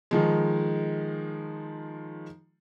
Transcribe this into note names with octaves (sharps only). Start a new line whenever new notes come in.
D#3 F3 G#3